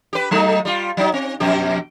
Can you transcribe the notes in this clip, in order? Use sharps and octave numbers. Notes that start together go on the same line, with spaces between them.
G4 B4
F#3 A3 D#4
G3 F4
F#3 D#4
C4
F2 B2 G4